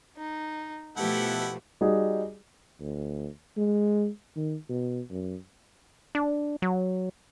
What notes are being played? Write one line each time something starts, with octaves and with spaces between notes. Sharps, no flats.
D#4
B2 F3 A3 E4 G4 A4 B4 F#5
G3 D#4 F#4 G#4
D2
G#3
D#3
B2
F#2
D4
F#3